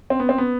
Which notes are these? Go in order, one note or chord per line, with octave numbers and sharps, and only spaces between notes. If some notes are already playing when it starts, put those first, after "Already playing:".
C4
B3
C4
B3